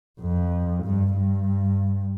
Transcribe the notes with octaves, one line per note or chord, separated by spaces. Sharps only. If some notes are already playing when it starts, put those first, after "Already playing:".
F2
G2
G2